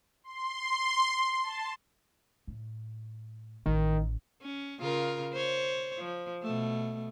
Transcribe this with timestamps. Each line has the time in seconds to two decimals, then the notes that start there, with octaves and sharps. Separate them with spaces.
0.24 C6
1.42 A5
2.47 A2
3.66 A1 D#3
4.42 C#4
4.80 C#3 F4 A#4
5.33 C5 C#5
5.99 F3
6.42 B2 A3